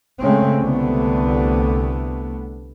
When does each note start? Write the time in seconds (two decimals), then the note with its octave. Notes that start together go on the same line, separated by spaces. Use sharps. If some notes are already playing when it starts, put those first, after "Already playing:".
0.21 C#3 G#3 A3 C4 C#4
0.61 C2 D3 A3 B3